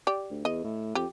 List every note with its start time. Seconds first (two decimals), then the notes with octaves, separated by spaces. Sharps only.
0.07 G4 D5
0.30 D2
0.45 E2 D#5
0.64 A2
0.95 F2 G4